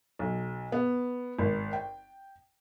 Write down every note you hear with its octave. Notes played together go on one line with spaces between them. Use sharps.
B1
B3
G#1
G5